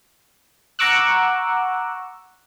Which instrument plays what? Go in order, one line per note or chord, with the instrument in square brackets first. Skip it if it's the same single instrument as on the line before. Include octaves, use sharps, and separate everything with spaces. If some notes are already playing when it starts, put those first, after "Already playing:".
[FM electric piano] F#5 A#5 C#6 D6 E6 F#6